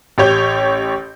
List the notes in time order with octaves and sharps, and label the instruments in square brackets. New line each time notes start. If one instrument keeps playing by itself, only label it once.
[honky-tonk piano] A1 G4 C#5 G6